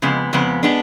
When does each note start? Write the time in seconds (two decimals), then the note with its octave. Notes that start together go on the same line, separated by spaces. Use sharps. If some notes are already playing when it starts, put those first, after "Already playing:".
0.02 F2 C#3 G#3 B3
0.33 F2 C#3 G#3 B3
0.63 G#3 B3 D4